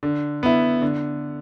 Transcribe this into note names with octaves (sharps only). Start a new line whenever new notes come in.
D3
B3 E4
D3